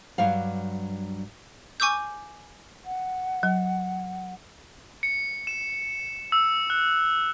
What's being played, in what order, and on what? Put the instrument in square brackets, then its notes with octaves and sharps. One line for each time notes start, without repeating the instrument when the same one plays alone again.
[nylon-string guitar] G2 F#3 G3 F5
[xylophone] G#5 C#6 D6 E6 G6
[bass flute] F#5
[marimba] F#3
[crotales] C#7
E7
E6
F#6